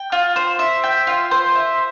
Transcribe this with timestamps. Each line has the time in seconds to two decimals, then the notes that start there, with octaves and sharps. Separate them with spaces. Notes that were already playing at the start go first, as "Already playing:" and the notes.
Already playing: G5
0.12 F4
0.36 C5
0.59 E5
0.84 G5
1.07 F4
1.31 C5
1.55 E5